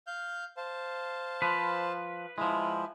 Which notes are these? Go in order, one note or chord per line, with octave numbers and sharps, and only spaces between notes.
F5 F6 G6
C5 F5 A5
F3 B4
F3 G#3 E4